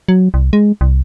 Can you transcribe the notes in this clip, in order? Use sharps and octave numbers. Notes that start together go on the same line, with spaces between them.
F#3
C2
G#3
C2